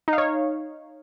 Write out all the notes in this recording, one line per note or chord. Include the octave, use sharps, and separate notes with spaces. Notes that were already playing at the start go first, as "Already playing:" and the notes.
D#4
F5
C#5